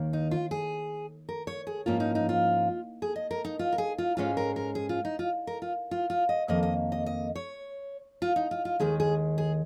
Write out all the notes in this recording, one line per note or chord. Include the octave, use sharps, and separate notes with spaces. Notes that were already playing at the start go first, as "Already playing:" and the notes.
Already playing: D#2 D#3 A#3
D#4
F4
G#4
A#4
C#5
G#4
G#2 F3 A#3 C#4 F4
D#4
D#4
F4
G#4
D#5
A#4
D#4
F4
A#4
G#4
F4
G#2 G#3 C#4 F4
A#4
A#4
G#4
F4
D#4
F4
A#4
F4
F4
F4
D#5
F2 D#3 A#3 D#5
D#5
D#5
D#5
C#5
F4
D#4
F4
F4
D#2 D#3 G#3 G#4
G#4
G#4